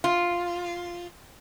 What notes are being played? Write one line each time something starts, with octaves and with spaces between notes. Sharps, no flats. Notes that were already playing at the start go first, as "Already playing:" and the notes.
F4